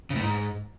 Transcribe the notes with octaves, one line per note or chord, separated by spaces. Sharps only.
C#3
A2
G#2